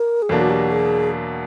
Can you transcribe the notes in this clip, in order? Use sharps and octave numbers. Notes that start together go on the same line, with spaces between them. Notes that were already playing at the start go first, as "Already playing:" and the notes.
Already playing: A#4
G#4
E2 B2 F#3 A#3 D4 A4
F#4
G4
G#4